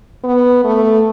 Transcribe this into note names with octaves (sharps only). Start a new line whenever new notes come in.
B3
A3